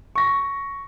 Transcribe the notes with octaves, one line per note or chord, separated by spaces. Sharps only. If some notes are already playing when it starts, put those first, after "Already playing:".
C#6 A#6